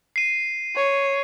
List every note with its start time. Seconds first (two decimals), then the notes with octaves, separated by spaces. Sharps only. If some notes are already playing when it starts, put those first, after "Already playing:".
0.16 C7 D#7
0.76 C#5